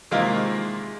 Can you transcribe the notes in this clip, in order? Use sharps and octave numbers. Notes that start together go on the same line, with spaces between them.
C3 D#3 G#3 A#3 E4 F4